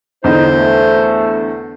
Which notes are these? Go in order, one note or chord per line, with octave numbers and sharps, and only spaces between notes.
E2 D3 D#4 C5
A3